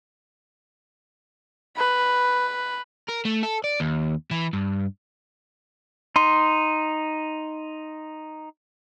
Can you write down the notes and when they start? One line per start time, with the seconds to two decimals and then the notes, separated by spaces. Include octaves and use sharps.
1.77 B4
3.08 A#4
3.25 A3
3.43 A4
3.64 D5
3.80 D#2
4.31 E3
4.53 G2
6.16 D#4 C6